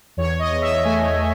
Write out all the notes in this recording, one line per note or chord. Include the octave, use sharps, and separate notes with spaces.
E2 C#5
D#5
E2
E5
A3 G#5